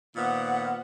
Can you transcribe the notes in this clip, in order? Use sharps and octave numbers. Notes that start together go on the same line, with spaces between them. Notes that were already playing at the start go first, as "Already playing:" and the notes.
A#2 D#3 B3 C5 F#5